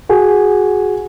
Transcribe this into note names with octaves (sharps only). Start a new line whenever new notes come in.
F#4 G#4